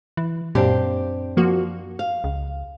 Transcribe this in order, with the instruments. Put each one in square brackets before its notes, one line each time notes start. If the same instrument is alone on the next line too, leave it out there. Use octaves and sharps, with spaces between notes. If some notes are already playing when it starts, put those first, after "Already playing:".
[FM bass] E3
[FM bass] F#2 [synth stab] A#2 [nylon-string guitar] C4 D4 G4
[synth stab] F3 A#3 F#4
[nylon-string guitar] F5
[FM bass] C#2